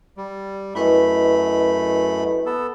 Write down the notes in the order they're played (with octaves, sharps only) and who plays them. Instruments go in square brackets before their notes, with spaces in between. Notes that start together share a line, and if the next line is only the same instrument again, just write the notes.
[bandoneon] G3
[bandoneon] F#2 A3 B5 [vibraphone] E4 B4 D#5
[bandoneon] B3 A4